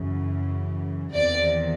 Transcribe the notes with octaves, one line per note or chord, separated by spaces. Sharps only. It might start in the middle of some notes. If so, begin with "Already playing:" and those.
Already playing: F#2 C#3 E3
E2 C3 D#3 D5